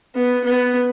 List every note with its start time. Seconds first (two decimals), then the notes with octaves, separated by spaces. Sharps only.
0.15 B3
0.44 B3